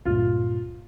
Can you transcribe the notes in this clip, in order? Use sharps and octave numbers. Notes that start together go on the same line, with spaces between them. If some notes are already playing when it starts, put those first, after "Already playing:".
C#2 G2 A#2 F4